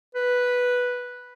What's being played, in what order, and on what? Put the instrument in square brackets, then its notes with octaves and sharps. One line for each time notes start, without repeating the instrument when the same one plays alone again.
[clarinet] B4